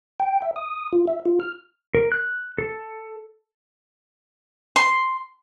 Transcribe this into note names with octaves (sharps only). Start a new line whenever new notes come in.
G5
E5
D#6
F4
E5
F4
F6
A#4
F#6
A4
C6